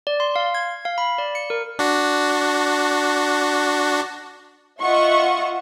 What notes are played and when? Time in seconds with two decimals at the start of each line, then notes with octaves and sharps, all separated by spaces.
0.07 D5
0.20 C6
0.36 F5
0.55 G#6
0.85 F5
0.98 B5
1.18 D5
1.35 C#7
1.50 A#4
1.79 D4 F#4
4.82 F4 D#5 E5 F#5 C#6